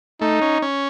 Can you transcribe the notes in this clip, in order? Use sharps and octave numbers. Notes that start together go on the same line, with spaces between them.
A3 D#4
C#4
C#4